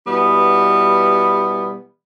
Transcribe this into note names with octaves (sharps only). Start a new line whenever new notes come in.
B2 E3 G3 B3